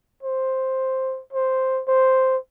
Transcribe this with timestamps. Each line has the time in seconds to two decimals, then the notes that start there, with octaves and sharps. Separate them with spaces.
0.23 C5
1.33 C5
1.88 C5